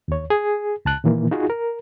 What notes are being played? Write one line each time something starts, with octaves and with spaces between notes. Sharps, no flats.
D#2 C#5
G#4
C#2 A5 F#6
A#2 D#3 E3 A#3
D#4 F4 F#4 G#4
A#4